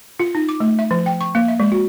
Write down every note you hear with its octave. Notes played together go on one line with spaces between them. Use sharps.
F4
D#4
D6
A3
E5
F3
G5
C#6
A#3
E5
G#3
F#4